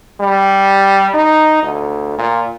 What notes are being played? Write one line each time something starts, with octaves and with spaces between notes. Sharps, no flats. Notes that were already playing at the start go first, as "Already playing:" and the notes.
G3
D#4
D2
A#2